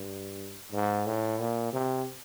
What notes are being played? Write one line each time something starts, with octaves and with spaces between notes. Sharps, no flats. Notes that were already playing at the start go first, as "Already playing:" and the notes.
Already playing: G2
G#2
A2
A#2
C3